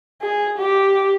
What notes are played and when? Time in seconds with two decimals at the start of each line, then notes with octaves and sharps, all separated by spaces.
0.21 G#4
0.58 G4